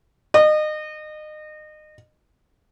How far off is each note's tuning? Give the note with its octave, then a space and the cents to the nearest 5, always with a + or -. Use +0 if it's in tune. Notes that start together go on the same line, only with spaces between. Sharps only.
D#5 -30